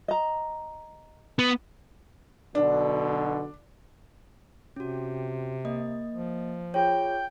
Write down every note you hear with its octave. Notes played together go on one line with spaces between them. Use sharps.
D#5 A#5
B3
B1 B2 D3 D4
C3 C#4 F#4
A#3 D#5
F3
F4 G#4 C#5 G5